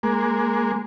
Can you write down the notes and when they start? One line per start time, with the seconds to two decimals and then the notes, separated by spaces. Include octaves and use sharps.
0.03 G#3 A#3